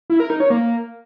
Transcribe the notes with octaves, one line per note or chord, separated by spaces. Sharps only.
E4
A#4
D#4
C#5
A#3